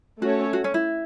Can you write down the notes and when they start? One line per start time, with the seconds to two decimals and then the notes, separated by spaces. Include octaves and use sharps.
0.22 A3 C#4 F#4 A4 C#5
0.53 F#4
0.64 C#4
0.74 E4